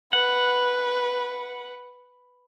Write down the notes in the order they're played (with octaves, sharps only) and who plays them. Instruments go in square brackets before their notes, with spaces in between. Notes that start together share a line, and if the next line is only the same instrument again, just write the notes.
[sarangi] B4 [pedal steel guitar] F#5